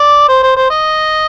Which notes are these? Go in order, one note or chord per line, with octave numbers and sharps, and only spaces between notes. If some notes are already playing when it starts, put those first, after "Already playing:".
Already playing: D5
C5
C5
C5
D#5